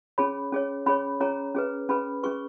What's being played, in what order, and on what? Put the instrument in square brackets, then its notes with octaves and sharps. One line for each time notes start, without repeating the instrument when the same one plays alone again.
[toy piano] C#4 G#4 C#5 B5
C#4 G#4 C#5
C#4 G#4 C#5 B5
C#4 G#4 C#5 A#5
C#4 G#4 B4
C#4 G#4 B4 B5
C#4 G#4 B4 C#6